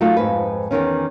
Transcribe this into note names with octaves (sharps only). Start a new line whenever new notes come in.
F#3 A3 D#4 F4 A4
F2 G#2 B4
E2 G2 D#3 C#4